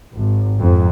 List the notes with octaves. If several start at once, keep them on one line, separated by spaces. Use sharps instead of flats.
G#1
F2 G#2